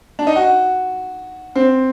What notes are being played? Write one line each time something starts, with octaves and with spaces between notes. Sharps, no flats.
D4
D#4
F#4
C4